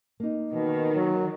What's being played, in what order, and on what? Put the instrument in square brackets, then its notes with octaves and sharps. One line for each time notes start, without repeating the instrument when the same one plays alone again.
[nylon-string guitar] A#3 D#4
[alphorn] B2 [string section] D#3
[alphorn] F#3